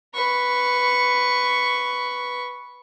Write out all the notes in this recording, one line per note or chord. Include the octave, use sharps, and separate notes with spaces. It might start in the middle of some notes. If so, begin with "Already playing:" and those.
B4 C#6